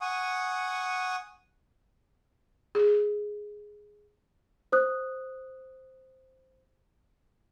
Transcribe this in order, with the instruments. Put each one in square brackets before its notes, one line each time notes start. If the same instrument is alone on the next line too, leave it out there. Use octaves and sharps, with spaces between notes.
[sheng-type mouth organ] F#5 G#5 C#6 D#6
[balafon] G#4
[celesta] C5 D#6 F#6